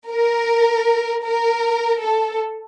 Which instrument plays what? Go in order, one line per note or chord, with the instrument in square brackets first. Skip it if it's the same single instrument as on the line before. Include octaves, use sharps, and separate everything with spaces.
[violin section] A#4
A#4
A4